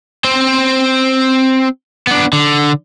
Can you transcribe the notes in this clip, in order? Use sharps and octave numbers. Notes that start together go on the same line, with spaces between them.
C4 C5
B3 D4
D3